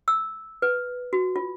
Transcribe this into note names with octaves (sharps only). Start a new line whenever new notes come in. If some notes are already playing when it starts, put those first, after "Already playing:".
E6
B4
F#4
F4